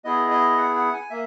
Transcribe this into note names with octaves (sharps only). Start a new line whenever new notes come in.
B3 E4 G#4 D#5
D#5
F#5
F#5
G#5
A#3 E5